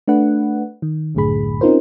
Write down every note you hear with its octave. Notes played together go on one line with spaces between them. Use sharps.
A3 D4 B4 F#5
D#3
C2 F#2 A2 D3 G#4 B5
C4 C#4 D#4 F4 A#4 C5